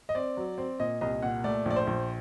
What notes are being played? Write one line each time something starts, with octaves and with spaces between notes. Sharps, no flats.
D#5
C4 D5
F#3
C4
A#2 D#5
C2 D#5
A#2 F#5
A3 D5
A#1 D5
C5
A#1